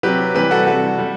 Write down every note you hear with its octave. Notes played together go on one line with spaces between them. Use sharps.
C3 F#3 G4 B4
C3 E3 G3 G4 B4
F#4 A4
C3 G3 F#4 A4
G3